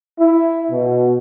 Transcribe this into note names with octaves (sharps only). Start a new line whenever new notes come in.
E4
B2